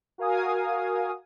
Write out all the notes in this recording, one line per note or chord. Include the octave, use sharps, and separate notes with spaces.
F#4 A#4 F5 G#5 D#6